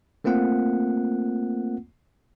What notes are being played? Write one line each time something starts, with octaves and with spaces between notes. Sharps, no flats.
A3 A#3 C4 F4 F#5